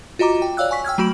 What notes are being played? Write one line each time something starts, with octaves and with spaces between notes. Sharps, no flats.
F4 F#4 D#5 A#5 D6
G5
C#5 D5 F5 E6 F#6
G#5 C#6 B6
G5 E6 F6 G#6
F#3 A3 F#4 B5 D7 F#7